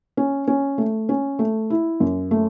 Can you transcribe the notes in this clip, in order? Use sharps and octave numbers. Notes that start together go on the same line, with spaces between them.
C#4
C#4
A3
C#4
A3
E4
F#2
A3